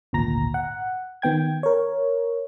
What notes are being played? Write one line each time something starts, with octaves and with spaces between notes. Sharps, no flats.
G#1 D2 A#2 A#5 A#6
F#5
D#3 B3 G5 G#6
A#4 C#5